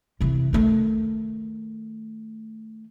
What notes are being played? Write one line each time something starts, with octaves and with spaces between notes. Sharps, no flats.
C3 E3
D#3 A3